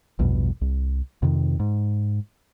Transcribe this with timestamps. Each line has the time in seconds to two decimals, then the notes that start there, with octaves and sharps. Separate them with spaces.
0.19 A#1 E2 G2 B2
0.61 C2
1.22 F2 C3 D#3
1.60 G#2